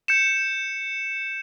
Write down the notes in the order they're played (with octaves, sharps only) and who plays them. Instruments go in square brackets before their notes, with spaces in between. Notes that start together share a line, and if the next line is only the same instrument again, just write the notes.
[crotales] G6 C#7 E7